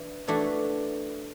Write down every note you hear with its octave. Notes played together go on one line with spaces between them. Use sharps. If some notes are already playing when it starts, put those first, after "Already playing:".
Already playing: E3 D4
E3 A3 D4 F#4